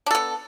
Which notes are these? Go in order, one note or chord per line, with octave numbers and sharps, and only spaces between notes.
B3 D4 A4